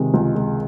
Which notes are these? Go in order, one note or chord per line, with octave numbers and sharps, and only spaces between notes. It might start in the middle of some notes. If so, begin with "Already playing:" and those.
Already playing: C3 D#3 G#3
C#2
G#3